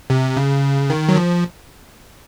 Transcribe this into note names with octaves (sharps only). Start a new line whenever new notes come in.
C3
C#3
D#3
F#3
F3